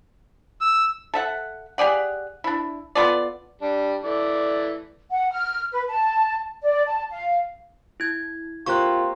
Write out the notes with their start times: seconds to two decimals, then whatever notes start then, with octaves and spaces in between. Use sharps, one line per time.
0.61 E6
1.14 A4 E5 F#5
1.78 G4 G#4 D5 F#5
2.44 D4 E4
2.95 B3 F4 A4 D5
3.61 G3 D4
4.04 E3 A3 D5
5.10 F#5
5.31 F6
5.72 B4
5.89 A5
6.62 D5
6.86 A5
7.10 F5
8.00 E4 G#6
8.66 A#3 C4 F4 G4 C#6 F#6